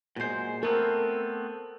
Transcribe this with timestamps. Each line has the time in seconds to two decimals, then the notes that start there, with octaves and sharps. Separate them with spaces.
0.16 F#2 A#2 G#3 C5
0.63 A3 B3 C4 A4 A#4